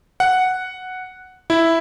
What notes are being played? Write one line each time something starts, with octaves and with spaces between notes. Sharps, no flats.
F#5
E4